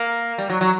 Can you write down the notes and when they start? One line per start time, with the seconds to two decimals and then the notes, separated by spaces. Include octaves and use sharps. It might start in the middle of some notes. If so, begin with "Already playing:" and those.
Already playing: A#3
0.38 G3
0.50 F#3
0.61 F#3